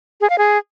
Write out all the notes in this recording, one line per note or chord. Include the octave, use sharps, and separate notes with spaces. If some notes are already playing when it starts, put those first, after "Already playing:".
G#4
F5
G#4